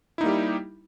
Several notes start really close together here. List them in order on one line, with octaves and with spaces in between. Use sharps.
E4 D#4 A#3 G3 G4